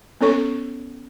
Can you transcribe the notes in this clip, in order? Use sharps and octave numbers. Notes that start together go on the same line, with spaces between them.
B3 C#4 A4 C#5 C#6